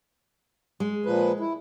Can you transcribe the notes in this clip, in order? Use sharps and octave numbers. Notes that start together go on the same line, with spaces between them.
G#3
A#2 F3 B4
E4